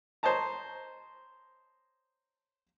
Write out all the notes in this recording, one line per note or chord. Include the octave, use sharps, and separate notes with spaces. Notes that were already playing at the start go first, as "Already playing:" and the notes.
C5 C#5 D#5 A5 A#5